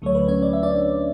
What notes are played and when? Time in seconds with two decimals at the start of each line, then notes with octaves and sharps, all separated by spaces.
0.02 D2 D3 F#3 A3 C#5
0.15 B4
0.28 C#4 C#5
0.42 D5
0.53 E5
0.63 D4 D5